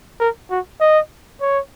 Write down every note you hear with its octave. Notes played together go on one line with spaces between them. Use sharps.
A#4
F#4
D#5
C#5